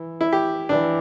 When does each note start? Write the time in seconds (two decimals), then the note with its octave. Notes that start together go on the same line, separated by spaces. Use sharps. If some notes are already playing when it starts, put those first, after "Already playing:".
Already playing: E3
0.21 E4
0.33 G4
0.69 E3 D4